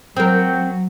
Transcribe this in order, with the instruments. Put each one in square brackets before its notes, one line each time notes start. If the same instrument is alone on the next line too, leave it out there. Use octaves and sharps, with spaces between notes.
[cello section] F#3 [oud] C4 A#4